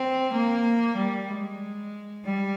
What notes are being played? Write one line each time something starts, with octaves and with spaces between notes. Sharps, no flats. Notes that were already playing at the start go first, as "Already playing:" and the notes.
Already playing: C4
A#3
G3
G#3
G3